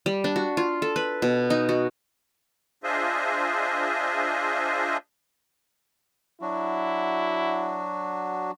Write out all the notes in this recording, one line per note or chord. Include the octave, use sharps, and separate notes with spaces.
G3
D4
F#4
F4
A4
B4
B2
D#4
F#4
D4 F4 G#4 C5 D#5 E5
F#3 D4 E4 F#4